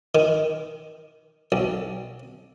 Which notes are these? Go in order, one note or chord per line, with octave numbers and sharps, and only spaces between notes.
D#3
B1